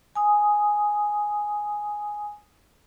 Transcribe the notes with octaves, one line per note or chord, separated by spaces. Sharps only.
G#5 D#6